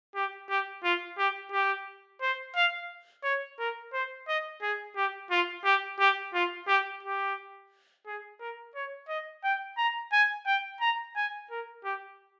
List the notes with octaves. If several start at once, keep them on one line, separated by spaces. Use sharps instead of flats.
G4
G4
F4
G4
G4
C5
F5
C#5
A#4
C5
D#5
G#4
G4
F4
G4
G4
F4
G4
G4
G#4
A#4
C#5
D#5
G5
A#5
G#5
G5
A#5
G#5
A#4
G4